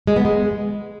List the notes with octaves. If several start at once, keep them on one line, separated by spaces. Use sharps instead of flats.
G#3
B3
G#3